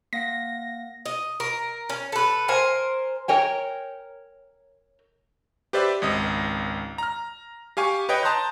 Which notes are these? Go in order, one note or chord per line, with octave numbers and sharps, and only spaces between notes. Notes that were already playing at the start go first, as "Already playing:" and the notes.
A#3 F5 F#5 A#6
D#5
A#4
C#4
A4 B4
A#4 C5 G#5
A#4 C#5 G5 G#5
G4 B4 C5 D5 E5
G#1 C#2 D#5
A#5 F6
G4 F5 G#5 C#6
B4 C#5 D#5 G5
A5 A#5 C6 D#6 F#6 G6